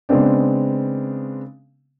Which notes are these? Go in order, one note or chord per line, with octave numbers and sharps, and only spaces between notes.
C#3 G#3 B3 C4 D4